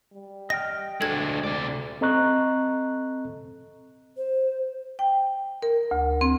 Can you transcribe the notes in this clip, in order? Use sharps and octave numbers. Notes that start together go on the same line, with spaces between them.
G3
D#5 G5 F6 A#6
D2 G#3 D4 A4 G#6
C3 D5
C4 A4 D#5 A#5 C#6 F#6
C5
G5
A#4
D2
C4